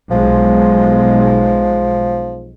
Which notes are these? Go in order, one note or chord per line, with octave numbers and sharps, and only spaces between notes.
B1 F3 G#3